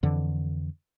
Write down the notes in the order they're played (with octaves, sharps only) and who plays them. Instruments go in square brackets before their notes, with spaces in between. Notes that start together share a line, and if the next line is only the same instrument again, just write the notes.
[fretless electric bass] F2 D3 E3